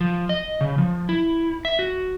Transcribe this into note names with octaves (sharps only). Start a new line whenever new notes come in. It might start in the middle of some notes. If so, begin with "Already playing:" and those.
F3
D#5
C#3
F3
E4
E5
F#4